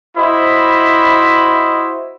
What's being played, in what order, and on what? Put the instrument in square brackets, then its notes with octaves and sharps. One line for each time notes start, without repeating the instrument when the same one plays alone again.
[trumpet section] E4 F#4 C5 D#5 B5